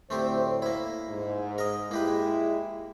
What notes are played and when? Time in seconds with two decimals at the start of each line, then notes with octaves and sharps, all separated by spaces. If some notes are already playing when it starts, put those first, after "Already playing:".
0.10 D2 A2 A3 C4 G4 C5
0.62 A#3 E4
1.08 G#2
1.58 A#4 D#5
1.91 G#3 A#3 E4 G4 B4